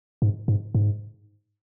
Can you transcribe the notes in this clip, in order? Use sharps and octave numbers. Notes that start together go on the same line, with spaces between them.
G#2
G#2
G#2